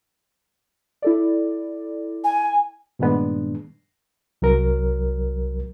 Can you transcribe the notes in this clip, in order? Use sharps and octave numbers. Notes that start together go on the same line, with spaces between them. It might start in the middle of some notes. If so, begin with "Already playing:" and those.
E4 A4 D5
G#5
G2 A#2 D#3 G#3 B3 D4
C2 F#3 A#4